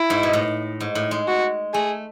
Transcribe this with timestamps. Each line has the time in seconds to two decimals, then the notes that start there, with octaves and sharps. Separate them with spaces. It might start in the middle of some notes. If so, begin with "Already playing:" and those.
Already playing: E4
0.10 G#2
0.23 B2
0.33 A2
0.80 G#2
0.95 A2
1.11 G#3
1.27 F#4
1.73 A3 G#4